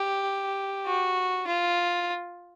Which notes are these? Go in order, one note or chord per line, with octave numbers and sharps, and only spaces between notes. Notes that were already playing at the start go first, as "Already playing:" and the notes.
Already playing: G4
F#4
F4